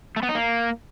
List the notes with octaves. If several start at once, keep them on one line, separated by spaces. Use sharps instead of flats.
A3
B3
D#4
A#3